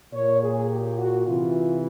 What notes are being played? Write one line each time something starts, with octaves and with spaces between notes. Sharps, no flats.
A#2 C#5
G#4
G4
F#4
C3 E3 F4